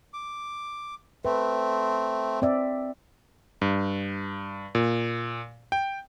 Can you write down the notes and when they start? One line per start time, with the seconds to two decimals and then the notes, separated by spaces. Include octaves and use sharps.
0.13 D6
1.25 A3 C4 B4
2.42 C4 D5 E5
3.62 G2
4.75 A#2
5.72 G5